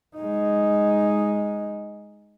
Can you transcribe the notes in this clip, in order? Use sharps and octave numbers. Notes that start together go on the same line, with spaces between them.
G#3 D#4